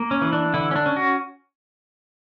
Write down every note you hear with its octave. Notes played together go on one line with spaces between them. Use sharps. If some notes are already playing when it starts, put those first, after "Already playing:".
Already playing: A#3
C#4
E3
D4
D3 E4
C#4
D4
C#4
F#4